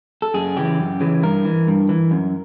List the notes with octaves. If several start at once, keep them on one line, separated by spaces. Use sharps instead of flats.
A4
F#2 G#4
C#3 E3 G4
F#2
C#3 E3
G2 A#4
E3
G2
E3
F#2